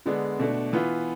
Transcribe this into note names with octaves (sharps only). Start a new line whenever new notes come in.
D3 G#3 B3 D4
B2 A3 D4
E3 B3 F4